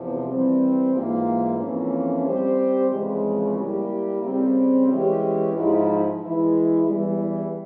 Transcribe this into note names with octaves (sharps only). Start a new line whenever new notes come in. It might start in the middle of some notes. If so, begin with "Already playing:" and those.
Already playing: E2 C3 F3
E3 G3 C4
G#2 E3 A#3 F4
F2 E3 A#3 C#4
G3 C4 G4 C5
F2 C#3 E3 G#3
G3 A#3 E4 G4
C#3 G3 C4
E3 G#3 C#4 G4
G#2 F3 G#3 E4
E3 G#3 E4
E2 E3 G3